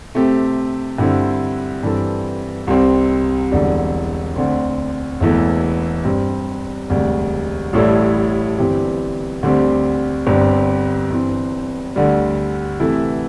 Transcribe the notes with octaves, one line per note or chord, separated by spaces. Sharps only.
C3 A3 C4 G4
G2 D3 C4 E4
G2 E3 C4 A4
C2 C3 G3 C4
E1 E2 D3 G3
D2 D3 C4
E1 E2 E3 A3
G2 G3 C4
E1 D2 C3 G3
A1 A2 G3 E4 A4
G1 G2 E3 C4 G4
D2 D3 G3 C4 G4
G1 G2 G3 C4 G4
G2 E3 C4
D2 D3 G3
C3 E3 A3 E4